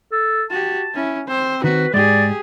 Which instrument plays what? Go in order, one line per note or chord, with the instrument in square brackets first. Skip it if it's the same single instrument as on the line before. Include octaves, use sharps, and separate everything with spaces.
[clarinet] A4
[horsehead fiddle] F#4 G4 [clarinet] A5
[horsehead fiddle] C#4 E4
[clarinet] C4 [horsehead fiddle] C5
[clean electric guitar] D#3 C4 [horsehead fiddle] F#4 [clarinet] B4
[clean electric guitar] G#2 G#3 [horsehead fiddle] G4 G#4 [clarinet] D5